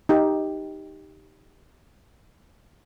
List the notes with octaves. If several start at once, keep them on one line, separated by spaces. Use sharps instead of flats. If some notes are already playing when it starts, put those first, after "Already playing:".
D#4 G4